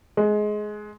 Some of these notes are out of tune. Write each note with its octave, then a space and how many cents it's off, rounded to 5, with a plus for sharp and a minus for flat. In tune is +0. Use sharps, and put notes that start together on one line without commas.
G#3 +20